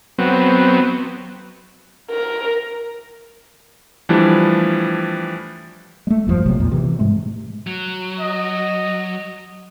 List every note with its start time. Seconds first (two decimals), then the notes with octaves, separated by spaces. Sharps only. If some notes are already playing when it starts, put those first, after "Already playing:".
0.19 F#3 B3 C4
2.11 A#4
4.09 E3 F3 G3 A3 D4 E4
6.07 G#3 A3
6.27 G1 F2 B2 F3
6.46 A#1 C3 F#3
6.58 E2 A#2
6.71 C3 E3
6.99 G#2 C3 G#3 A3
7.67 F#3
8.20 D#5